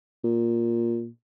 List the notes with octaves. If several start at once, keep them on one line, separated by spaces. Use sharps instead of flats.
A#2